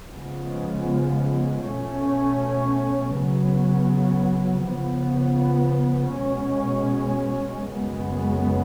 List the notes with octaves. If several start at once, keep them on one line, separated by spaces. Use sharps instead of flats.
C#3 F3 G#3 B3
B2 A3 C#4
C#3 F#3 B3
C#3 F3 B3
B2 G#3 C#4
F#2 C#3 G#3 B3